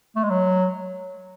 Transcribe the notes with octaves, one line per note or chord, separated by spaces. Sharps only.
A3
G#3
F#3